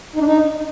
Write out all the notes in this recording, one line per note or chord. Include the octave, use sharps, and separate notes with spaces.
D#4
D4
D#4